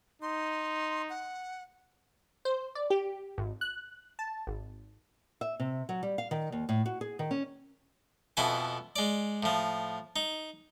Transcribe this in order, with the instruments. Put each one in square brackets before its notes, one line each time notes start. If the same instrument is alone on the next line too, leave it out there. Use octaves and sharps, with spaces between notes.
[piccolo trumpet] D#4 [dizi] C6
[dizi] F#5
[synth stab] C5
D5
G4
G#1
F#6
A5
G#1
[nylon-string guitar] E5
C3
F#3
G3
F5
D#3
D#2
A2
F#4
G#4
D#3
C#4
[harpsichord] F2 B2 E4 A4 G#5
G#3 D5
A2 F3
D#4